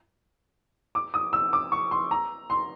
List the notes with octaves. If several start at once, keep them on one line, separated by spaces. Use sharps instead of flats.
D6
D#6
E6
D6
C#6
C6
A#5
C6